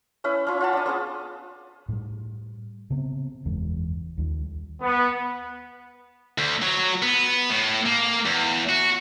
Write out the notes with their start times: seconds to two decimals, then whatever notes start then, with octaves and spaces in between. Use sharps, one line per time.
0.24 C#4 E4 B4
0.47 C#4 F4
0.61 F4 F#5 A5
0.73 D4 D#6
0.86 B3 C#4 G#4
1.89 A2 G3
2.90 C#3 B3 C4
3.45 F#1 E2 E3 G#3
4.18 D#2 G3
4.81 B3
6.38 D2
6.62 F#3
7.02 B3
7.50 A2
7.86 A#3
8.26 E2
8.69 F#4